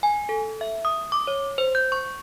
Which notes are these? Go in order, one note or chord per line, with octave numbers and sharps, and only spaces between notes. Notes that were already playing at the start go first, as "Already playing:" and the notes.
G#5
A4
E5
D#6
D6
C#5
C5
G6
C#6